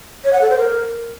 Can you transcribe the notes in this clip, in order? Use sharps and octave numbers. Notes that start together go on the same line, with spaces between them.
C#5
F#5
A4
C5
A#4